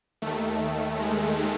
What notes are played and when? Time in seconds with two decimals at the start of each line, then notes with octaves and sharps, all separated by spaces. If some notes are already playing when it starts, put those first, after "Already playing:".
0.22 D#2 D#3 A3
1.00 G#3